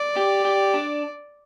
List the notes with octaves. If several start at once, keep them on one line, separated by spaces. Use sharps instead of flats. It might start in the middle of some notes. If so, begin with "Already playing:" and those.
Already playing: D5
G4
G4
D4